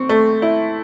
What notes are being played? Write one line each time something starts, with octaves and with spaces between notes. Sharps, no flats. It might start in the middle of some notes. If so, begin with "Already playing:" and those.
Already playing: C4 C#6
A3
E4